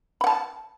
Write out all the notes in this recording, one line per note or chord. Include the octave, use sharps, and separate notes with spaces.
F#5 A5 B5